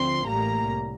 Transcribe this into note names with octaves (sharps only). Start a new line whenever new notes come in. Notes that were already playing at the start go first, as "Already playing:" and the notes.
Already playing: D2 D3 F3 C4 C6
A1 A2 G3 A#3 A#5
C2